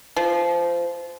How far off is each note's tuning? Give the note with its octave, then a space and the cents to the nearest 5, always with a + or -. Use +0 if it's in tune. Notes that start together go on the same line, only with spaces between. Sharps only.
F3 -20